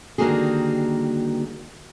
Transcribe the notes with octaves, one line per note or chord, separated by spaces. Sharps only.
D3 D#3 G3 A#3 F#4 G#4